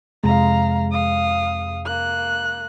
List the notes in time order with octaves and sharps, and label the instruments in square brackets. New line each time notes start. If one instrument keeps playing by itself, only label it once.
[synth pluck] F2 C3 G#3 [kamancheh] F5 A#5
[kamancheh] F5 D#6
A#3 F#6